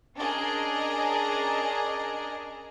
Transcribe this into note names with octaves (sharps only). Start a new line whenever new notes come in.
C#4 D4 G#4 A#4 D#5